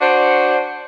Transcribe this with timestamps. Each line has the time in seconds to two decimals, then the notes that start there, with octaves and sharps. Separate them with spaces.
0.01 D4 F#4 C5